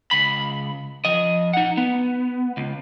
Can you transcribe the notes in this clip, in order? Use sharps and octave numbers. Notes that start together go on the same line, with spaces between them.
C#2 B5
F3 D#5
D#4 F#5
B3
C#2